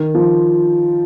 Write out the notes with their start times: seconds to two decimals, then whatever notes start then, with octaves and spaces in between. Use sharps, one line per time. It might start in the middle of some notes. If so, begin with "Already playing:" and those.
Already playing: D#3
0.15 F3